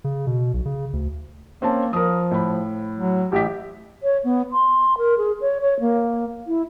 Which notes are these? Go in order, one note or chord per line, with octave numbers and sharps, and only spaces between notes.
C#3
B2
B1
C#3
D2
A#3 C4 C#4 A5
F3 A#4 D#6
A2 B5
F#3
A1 G4 E5 B6
C#5
B3
C6
A#4
G#4
C#5
C#5
A#3
E4